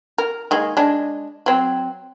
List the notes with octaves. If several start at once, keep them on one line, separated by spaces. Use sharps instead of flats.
A#4
D#3 G#3 A#3
G#3 D4
F#3 C4